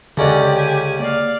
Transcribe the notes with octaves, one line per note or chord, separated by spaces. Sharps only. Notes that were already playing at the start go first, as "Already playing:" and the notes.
C#2 D3 C#4 F#4 G4 A4 D5
G#5
A#3 D5 F5